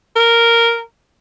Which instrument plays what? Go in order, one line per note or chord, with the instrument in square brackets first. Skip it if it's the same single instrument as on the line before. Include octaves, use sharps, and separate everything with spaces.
[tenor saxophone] A#4